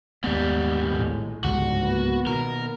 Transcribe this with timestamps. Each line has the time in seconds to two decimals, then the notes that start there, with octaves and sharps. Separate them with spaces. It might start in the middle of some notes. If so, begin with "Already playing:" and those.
0.24 D#2 G#2 G3 B3
0.88 A#1 A2 G#3
1.44 G1 C#2 G#2 F#4
1.78 A#3 B3
2.27 B2 D#3 A#4